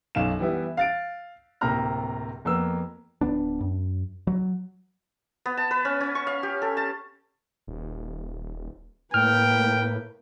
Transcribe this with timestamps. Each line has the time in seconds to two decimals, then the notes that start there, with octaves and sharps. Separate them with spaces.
0.15 B1 F#2 F5 E7
0.39 E3 G3 B3 E4
0.77 F5 A6 D7
1.61 D1 C3 A#3 G4 A#5 F6
2.45 F2 A#3 B3 E6
3.21 D1 F2 B3 D4
3.61 F#2
4.27 F#3
5.46 B3
5.57 A5
5.71 B4
5.85 C#4
6.00 C#4
6.15 C#6
6.27 F5
6.43 G4
6.62 A4
6.77 A5
7.67 D#1
9.14 A2 A#3 B4 G5 F6